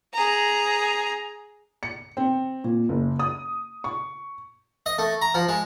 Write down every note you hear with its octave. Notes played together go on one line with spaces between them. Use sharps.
G#4 A#5
C#7
C4
A#2
F#1
D#6
C#6
D#5
A3
A#5
F3
G#3